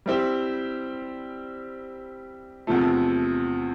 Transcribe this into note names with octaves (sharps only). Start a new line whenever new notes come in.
G3 C4 E4 G4 C5
E2 C3 F3 A3